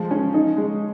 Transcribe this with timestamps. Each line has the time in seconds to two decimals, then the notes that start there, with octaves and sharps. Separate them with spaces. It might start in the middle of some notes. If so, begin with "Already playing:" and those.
Already playing: F3 G#3
0.11 C#4
0.34 D#4
0.57 G#3